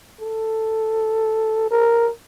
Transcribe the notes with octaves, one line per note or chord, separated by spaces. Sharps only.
A4
A#4